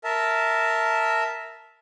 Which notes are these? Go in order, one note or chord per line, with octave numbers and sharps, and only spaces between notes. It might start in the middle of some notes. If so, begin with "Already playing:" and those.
A#4 E5 A5